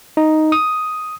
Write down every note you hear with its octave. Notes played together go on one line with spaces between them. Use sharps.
D#4
D#6